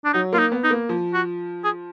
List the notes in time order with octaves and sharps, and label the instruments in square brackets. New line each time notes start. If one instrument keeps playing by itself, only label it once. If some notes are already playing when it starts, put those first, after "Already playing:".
[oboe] D4
[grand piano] F#3 [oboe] D#4
[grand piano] A#3 [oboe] F4
[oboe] D#4
[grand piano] B3
[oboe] D#4
[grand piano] A#3
F3
[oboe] F#4
G#4